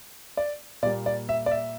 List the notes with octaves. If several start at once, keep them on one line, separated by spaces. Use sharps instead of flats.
D5
A#2 G3 A#3 D5
D5
E5
D5
E5